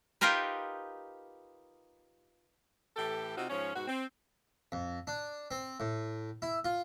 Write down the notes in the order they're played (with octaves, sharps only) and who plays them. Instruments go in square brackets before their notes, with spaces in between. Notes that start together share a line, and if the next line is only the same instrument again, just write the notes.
[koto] D#4 F4 G4 A#4 B4
[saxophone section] A2 E3 G4 A4
C3 C4 D#4 F4 F#4
G#2 F3 C#4
G#2 B2 F#4
C4
[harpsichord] F2
D4
C4
A2
E4
F4